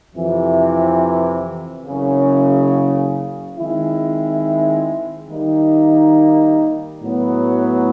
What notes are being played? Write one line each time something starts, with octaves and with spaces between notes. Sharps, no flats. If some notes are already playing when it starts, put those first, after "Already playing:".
F2 C3 E3
F#1 F#2 C#3
D#3 G#3 C4 E4
D#3 G3 A#3 D#4
A2 F#3 B3